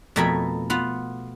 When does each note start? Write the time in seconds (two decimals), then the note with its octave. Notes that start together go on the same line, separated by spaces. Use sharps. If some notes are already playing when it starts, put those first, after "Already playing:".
0.16 F2 B2 A3 A#4 G#5 B5
0.70 B3 F4 F#5